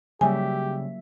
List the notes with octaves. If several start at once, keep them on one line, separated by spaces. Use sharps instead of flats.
C#3 F#3 G3 A#3 G4 E5 G#5